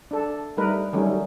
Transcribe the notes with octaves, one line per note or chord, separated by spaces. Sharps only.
D4 A4
G3 A3 D#4 A#4 B4
D#3 F#3 G3 A3 C#4 D#4